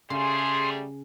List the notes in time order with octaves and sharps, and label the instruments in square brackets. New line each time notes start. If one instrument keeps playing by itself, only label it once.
[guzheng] C#3 [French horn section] G3 A3 G#4 [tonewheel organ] C6